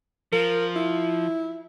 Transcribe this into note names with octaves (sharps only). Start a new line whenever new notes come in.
F3 A#4
E4